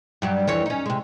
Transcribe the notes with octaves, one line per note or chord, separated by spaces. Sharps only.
G2 F#3 G3
F2 E3 C#5
C#4 D#4
C3 G#3